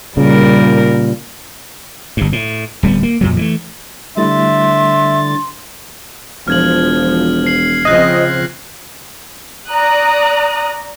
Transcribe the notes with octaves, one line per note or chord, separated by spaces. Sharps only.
A#2 C#3 G3 A#4
G1 G2
A2
D1 G3 A#3 B3
A#3
F2 A#2 F#3
E3 G3 A3
D3 G3 A3 E4 E5 C6 A6
E1 F3 F6 G#6 F#7
C7 F#7
C#3 F3 C4 D#5 F#6 A#6
D5 A#5 D#6 F#6